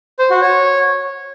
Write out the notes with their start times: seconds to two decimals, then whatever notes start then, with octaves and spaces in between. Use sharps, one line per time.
0.19 C5
0.30 F#4
0.42 C#5